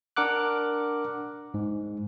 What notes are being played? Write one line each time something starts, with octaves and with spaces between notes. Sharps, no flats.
D4 A#4 F#5 D6 F#6
G#2